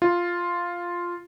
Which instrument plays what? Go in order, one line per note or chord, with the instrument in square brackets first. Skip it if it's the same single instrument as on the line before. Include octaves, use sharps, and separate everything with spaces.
[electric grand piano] F4